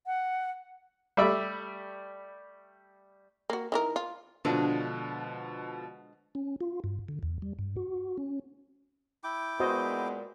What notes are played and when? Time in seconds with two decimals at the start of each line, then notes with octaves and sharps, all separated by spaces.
0.06 F#5
1.17 G3 A3 D5 E5 B5
3.50 A#3 F#4
3.72 D#3 E3 A#4
3.96 F4
4.45 B2 D3 F3 G#3 D4 F#4
6.35 C#4
6.61 F4
6.84 G2
7.08 D3
7.23 E2
7.42 G3
7.59 G2
7.76 F#4
8.18 C#4
9.24 E4 G5 D6
9.60 A#2 G#3 B3 F#4 C5 D#5